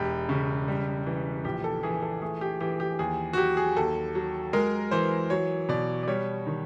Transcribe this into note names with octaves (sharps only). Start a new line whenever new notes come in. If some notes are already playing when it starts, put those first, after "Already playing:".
Already playing: E1 G4
C#3
G3
E3
A#1 G4
A4
E3 G#4
A4
A3 G#4
G4
E3 G4
G4
D#2 G#4
F#4
F#3 G4
G#4
D#2 A4
F#3
G#3 A#4
E3 C5
F#3 C#5
B2 D5
D5
G3 C#5
D#3